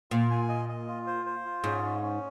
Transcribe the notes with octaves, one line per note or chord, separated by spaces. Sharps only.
A#2 F4
G#5
D#5
D#5
F4
C5
C5
F4
G#2 C#4
C#4
C#4